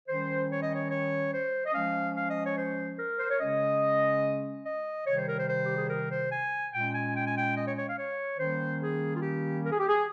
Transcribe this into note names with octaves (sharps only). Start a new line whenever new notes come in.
D#3 G3 C#4 C5
C#5
D#5
C#5
C#5
C5
D#5
F3 G#3 C#4 F5
F5
D#5
C#5
C5
A#4
C5
C#5
C#3 G#3 C#4 D#5
D#5
C3 D#3 G3 C#5
C5
A#4
C5
C5
G4
G#4
A#4
C5
G#5
A#2 G#3 C#4 G5
G#5
G5
G#5
G5
D#5
C#5
C#5
F5
C#5
D#3 G3 A#3 C#4 C5
G#4
F4
G4
A#4
G#4
G4
G#4